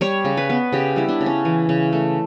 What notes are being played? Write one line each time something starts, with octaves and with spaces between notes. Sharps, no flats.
G3 C#5
C#3
B4
B3
C#3 G4
G3 E4
D4
C#3
C#4
E3
C#3
A3